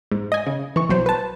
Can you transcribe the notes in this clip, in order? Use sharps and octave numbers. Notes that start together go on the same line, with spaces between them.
G#2
D#5 G#5
C#3
E3 C#6
B1 F#3 C5
B4 A5